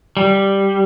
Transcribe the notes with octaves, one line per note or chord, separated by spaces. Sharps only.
G3